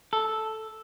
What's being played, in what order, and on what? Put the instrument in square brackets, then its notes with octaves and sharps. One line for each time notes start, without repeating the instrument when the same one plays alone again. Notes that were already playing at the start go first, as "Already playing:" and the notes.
[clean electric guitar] A4